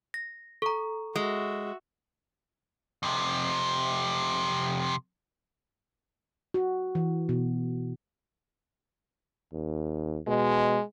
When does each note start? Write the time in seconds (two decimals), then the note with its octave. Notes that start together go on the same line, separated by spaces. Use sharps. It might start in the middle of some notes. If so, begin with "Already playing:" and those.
0.14 A#6
0.62 A4 A#5 C#6
1.16 G#3 F#4 E5
3.03 F2 C3
6.54 F#4
6.95 E3
7.29 B2
9.53 D#2
10.27 B2 G#3